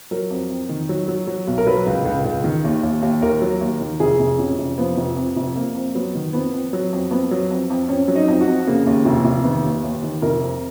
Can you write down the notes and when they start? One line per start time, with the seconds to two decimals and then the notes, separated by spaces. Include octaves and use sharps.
0.11 F#3 A#4
0.30 F2
0.50 F2
0.69 D#3
0.89 F#3
1.08 F#3
1.27 F#3
1.47 B1
1.58 A#4
1.67 F#3 B4
1.87 C#2
2.05 C#2
2.25 C#2
2.44 D#3
2.64 D#2
2.83 D#2
3.02 D#2
3.22 D#2 A#4
3.42 F#3
3.61 D#2
3.81 D#3
4.00 F1 G#4
4.20 F1
4.39 F1 C#4
4.58 F1
4.78 F3 B3
4.97 F1
5.17 F2
5.36 F1
5.55 F2 A#3
5.75 F2
5.95 F#3 B3
6.15 D#3
6.33 F2 B3
6.53 F2
6.73 F#3
6.92 F2
7.11 F2 B3
7.31 F#3
7.51 F2
7.70 F2
7.88 F2 C#4
8.08 F#3
8.16 D#4
8.28 F2
8.41 F#4
8.47 F2
8.67 C#3 A#3
8.86 D#2
9.05 F1
9.25 F1
9.44 D#3 B3
9.65 D#2
9.83 D#2
10.03 D#3
10.22 F1 A#4
10.42 F2